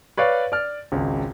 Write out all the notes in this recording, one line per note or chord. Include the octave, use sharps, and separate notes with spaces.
B4 C#5 D5 F5
D5 F6
G#1 C#2 C#3